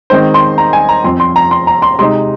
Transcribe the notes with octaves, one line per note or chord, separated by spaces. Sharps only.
D#3 G#3 C4 D#4 C5
C6
A#5
G#5
A#5
F2 F3 C4 C6
C6
A#5
C6
A#5
C6
C3 G#3 D#4 C6